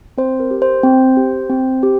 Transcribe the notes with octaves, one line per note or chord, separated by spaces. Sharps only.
C4 C5
A#4
G4
C5
C4
G4
C4
G4